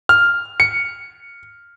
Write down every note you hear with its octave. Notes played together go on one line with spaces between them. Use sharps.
F6
C#7